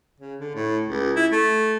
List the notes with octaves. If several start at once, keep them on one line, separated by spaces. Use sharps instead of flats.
C#3
D3
A2
C#2
E4
A3